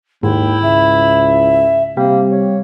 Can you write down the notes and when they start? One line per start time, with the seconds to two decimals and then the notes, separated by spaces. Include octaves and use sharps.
0.23 D#2 G#2 E4 G5
0.62 C#2 E5
1.97 C3 G3 A#3
2.31 C#5